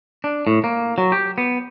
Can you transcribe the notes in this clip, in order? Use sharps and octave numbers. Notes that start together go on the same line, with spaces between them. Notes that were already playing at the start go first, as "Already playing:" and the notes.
D4
A2
A#3
F#3
G4
B3